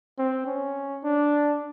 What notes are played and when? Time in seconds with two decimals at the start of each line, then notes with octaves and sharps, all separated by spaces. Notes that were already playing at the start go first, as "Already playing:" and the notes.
0.19 C4
0.47 C#4
1.04 D4